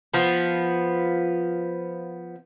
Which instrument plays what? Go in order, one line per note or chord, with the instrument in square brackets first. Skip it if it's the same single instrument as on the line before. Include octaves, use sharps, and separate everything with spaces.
[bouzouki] F3 B3